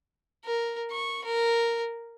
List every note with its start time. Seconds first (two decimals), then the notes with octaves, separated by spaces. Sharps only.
0.45 A#4
0.91 C#6
1.24 A#4